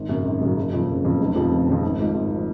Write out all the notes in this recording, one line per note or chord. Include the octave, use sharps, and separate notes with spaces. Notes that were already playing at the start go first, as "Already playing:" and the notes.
Already playing: G#1
F#2 C#3 F#3
G#1
F#2 C#3 F#3
F#1
F2 C#3
F#1
F2 C#3
F1
F2 C#3 F3 C4
F1
F2 C#3 F3 C4
G#1
G#2 F3
G#1
F3